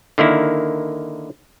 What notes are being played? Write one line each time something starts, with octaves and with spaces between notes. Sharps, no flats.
D3 D#3 A#3 E4